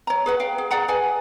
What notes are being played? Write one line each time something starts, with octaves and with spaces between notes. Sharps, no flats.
C#5 A#5
G#4 B4 F#5
F5 G5
G#4
G#4 D5 F#5 A#5
G#4 B4 F#5 G#5